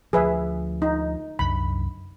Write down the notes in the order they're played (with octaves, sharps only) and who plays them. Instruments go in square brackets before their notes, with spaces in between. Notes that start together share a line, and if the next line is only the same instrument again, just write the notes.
[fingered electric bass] D2 F3 [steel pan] G#4 B4 E5
[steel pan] D#4
[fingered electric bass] C2 F#2 D3 [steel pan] B5